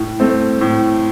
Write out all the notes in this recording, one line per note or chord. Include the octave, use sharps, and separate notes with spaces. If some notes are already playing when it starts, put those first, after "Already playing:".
Already playing: A2
A3 C4
A2